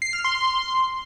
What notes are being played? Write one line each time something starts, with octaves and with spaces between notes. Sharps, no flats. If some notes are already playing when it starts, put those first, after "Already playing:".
C7
F6
C6